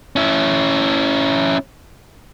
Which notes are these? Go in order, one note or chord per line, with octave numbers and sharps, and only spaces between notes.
C#4 E4